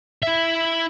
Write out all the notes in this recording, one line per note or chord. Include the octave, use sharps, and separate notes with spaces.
E4 E5